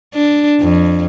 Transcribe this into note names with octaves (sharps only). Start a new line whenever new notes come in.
D4
F2